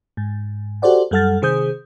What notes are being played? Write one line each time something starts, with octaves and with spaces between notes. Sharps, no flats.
G#2
F#4 G4 A4 C5 D5 F#5
F#2 G3 A4 F#5 F6 A6
C3 D#3 G#4 C5 D#6 G6